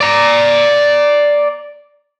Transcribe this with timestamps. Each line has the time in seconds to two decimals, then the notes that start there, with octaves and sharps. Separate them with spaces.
0.01 D5 A#5